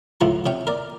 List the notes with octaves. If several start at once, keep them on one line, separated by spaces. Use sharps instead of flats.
C#2 A2 F3 F#4 A#5
C3 C#4 G5
A#4 D5